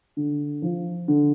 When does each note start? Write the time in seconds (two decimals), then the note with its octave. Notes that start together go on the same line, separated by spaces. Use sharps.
0.17 D3
0.62 F3
1.08 D3